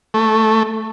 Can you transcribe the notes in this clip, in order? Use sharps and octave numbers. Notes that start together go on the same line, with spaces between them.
A3